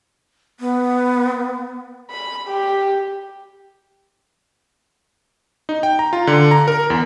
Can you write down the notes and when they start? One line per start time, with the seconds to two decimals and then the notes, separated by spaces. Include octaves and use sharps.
0.60 B3
2.11 B5
2.47 G4
5.69 D#4
5.83 G5
5.99 A#5
6.13 F4
6.27 D3
6.51 A#5
6.68 A#4
6.90 E2